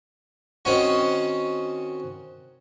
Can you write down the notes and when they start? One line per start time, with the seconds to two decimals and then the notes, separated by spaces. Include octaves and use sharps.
0.65 D#3 C4 C#4 F#4